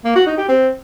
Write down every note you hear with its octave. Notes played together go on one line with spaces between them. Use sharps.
A#3
F#4
D#4
G4
C4